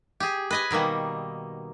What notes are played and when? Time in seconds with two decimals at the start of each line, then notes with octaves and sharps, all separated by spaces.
0.20 G4 G#4
0.51 B4 D#5 G#5
0.71 B2 D#3 G3 A#3